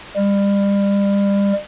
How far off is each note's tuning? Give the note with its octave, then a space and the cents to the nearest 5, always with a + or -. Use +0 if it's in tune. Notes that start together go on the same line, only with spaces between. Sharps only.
G3 +35